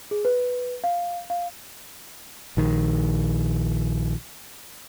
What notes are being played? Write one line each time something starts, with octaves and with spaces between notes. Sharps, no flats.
G#4
B4
F5
F5
A#1 D#3